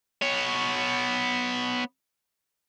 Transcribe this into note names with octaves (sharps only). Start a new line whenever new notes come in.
B3 C#5